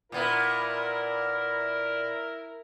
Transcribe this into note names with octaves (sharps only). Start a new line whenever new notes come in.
A#2 B3 E4 A#4